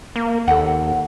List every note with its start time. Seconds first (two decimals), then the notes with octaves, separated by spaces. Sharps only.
0.16 A#3
0.48 D#2 A4 F#5